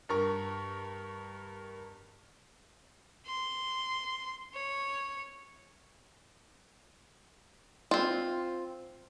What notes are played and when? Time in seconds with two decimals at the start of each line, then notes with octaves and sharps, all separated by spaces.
0.09 G2 A#4 C#6
3.26 C6
4.55 C#5
7.91 C4 F4